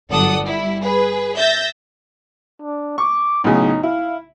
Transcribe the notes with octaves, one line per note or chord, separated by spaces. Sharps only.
G1 F#3 A4 D5 F#5 D#6
G3 E4
G#4 B4
E5 G6 A6 A#6
D4
C#6 D6
B1 A2 C#3 D#4
E4 F5